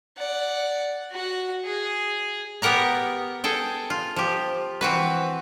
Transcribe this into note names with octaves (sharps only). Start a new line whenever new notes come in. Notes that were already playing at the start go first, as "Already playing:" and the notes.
D5 F#5
F#4 F#5
G#4
B3 G4 A#4 F#5 A#5
G#4 A4 G5
F4
F3 G4
E3 C4 F#4 B4